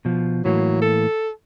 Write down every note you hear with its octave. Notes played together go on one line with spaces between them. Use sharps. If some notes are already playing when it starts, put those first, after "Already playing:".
B2 F3
A2 E3 F#3 A#3
A4